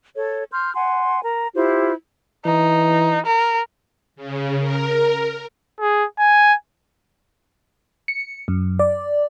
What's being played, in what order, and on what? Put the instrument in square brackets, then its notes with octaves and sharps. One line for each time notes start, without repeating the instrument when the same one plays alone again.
[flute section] A4 C#5
C6 F6 G6
F#5 G#5 C6
A#4 A#5
E4 F4 G4 C5
[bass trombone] E3 [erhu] D#4
[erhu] A#4
[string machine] C#3
A#4
[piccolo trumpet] G#4
G#5
[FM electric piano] C#7
F#2
D5